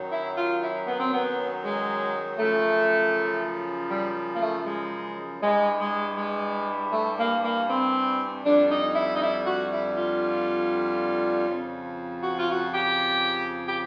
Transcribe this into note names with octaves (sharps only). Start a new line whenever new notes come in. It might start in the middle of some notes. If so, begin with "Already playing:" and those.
Already playing: F#2 D#3 F#3
E4
F4
E4
B3
C4
B3
G#3
F#2 C#3 F3 A3
G3
A#3
A3
G#3
G2 E3 G3 G#3
G#3
G#3
A3
A#3
A#3
C4
F2 D3 G3 D4
D#4
E4
D#4
E4
F#4
E4
F4
F2 C#3 F3
F#4
F4
F#4
G4
G4